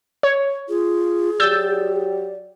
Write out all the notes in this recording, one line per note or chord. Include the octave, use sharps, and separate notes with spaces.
C#5
F4 G#4
F#3 F#4 G4 D5 E6 G6 A6